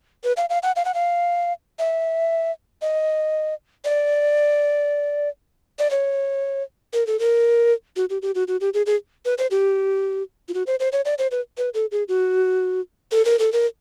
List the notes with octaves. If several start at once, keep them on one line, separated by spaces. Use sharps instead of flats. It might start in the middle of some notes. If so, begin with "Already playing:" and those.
B4
F5
F5
F#5
F5
F#5
F5
E5
D#5
D5
D5
C#5
A#4
A4
A#4
F#4
G4
G4
F#4
F#4
G4
G#4
G#4
B4
C5
G4
F4
F#4
C5
C5
C#5
D5
C5
B4
B4
A4
G#4
F#4
A4
A#4
A4
A#4